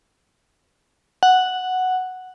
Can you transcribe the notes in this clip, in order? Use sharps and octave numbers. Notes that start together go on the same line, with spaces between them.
F#5